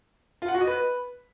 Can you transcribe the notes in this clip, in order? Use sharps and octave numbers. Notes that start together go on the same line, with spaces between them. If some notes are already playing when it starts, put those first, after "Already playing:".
F4
F#5
F#4
D#5
B4